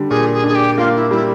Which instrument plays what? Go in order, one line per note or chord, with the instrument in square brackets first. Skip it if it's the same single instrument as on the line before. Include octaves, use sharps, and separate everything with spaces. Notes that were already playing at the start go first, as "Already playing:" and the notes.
Already playing: [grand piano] D3 G3
[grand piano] A#2 [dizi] G#4
[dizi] G#4
[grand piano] D4 [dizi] G#4
[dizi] G4
[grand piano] A#3 [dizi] F4
[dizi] E4
[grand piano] G3 [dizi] E4